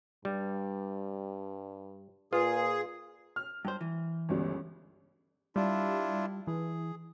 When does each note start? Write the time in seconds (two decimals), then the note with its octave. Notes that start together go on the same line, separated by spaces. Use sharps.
0.25 G2 G3
2.33 A#2 F4 G#4 B4
3.36 F6
3.65 G2 C5
3.81 E3
4.29 G1 C#2 G3
5.56 G3 D4 E4 F4
6.47 E3 G#4